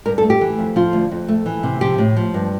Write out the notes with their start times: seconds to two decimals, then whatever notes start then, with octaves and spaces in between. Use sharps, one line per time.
0.06 G2 A#4
0.18 A4
0.23 A3
0.30 G4
0.41 E3
0.58 F2
0.76 F3 F4
0.93 D2
1.11 F2
1.28 A3
1.46 E3
1.63 C3
1.81 F3 G4
1.98 A2
2.17 F3
2.34 G2